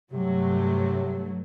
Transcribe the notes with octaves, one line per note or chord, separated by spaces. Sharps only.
G2 C3 F#3 A3